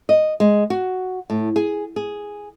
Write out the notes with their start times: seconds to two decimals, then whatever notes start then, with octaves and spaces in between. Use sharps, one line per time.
0.09 D#5
0.40 G#3
0.70 F#4
1.30 A2
1.56 G#4
1.96 G#4